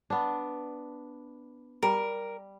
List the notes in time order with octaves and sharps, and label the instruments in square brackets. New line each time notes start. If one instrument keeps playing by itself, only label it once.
[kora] B3 D4
[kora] G3 [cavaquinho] A#4